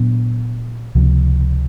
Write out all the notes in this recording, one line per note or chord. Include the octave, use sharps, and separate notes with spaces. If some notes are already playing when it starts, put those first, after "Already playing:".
Already playing: A#2 F#3 B3 D4
C#2 C3 F3